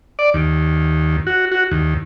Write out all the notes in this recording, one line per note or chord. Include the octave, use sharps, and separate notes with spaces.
D5
D#2
F#4
F#4
D#2